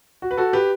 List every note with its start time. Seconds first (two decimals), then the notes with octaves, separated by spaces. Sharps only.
0.22 F#4
0.31 B4
0.37 F#4 A4
0.53 G4 B4